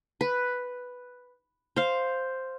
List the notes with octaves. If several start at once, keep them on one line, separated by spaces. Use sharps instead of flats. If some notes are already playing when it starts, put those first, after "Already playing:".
B4
C5 F5